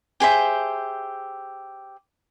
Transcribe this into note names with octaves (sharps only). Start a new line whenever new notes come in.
G4 G#4 C5 E5